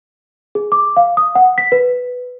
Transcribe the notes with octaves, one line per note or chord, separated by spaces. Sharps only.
G#4
D6
F5
D#6
F#5
B6
B4